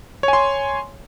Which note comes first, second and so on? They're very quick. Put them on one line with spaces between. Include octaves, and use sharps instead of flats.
C#5 G#5 C6